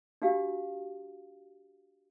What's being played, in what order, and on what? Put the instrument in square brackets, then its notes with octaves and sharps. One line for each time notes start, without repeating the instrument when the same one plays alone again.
[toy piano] D4 F#4 G4 F5